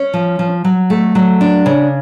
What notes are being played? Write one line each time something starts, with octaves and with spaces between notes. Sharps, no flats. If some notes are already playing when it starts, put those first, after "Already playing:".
Already playing: C#4
F3
F3
F#3
A3
F#3
D4
C#3